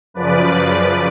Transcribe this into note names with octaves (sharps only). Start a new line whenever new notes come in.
F#2 C#3 F3 B4 D5